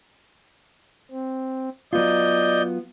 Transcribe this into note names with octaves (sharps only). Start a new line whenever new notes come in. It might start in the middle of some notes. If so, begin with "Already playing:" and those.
C4
F#3 B3 F4 D5 D#5 G6